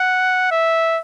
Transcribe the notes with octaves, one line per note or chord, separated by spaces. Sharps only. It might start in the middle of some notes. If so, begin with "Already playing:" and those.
Already playing: F#5
E5